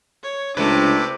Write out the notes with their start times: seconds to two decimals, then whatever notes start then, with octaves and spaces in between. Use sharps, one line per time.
0.23 C#5
0.57 C#2 C3 A3 D4 B4 D6